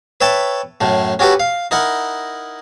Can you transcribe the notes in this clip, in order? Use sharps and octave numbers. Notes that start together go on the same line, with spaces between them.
B4 C#5 E5 G5 A5
F#2 A2 A3
C#4 F#4 G4 A4 B4
F5
D#4 E4 A#4 F#5